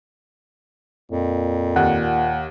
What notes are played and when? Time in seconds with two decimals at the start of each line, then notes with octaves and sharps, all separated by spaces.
1.11 F2 A#2
1.76 D#2 F#5